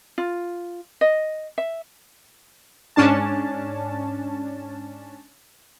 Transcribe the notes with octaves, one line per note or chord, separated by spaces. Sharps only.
F4
D#5
E5
G#2 C#4 D4 A5